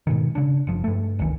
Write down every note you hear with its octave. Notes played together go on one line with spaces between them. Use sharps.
G#2 B2 D#3
C#3 D4
F#1 F3
G2 A3
F1 C#2 D#3 E3